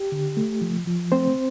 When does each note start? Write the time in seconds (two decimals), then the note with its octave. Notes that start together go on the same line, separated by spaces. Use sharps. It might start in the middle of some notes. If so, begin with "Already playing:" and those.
Already playing: G4
0.12 D3
0.37 A3
0.61 F3
0.87 F3
1.11 A3 C4 C5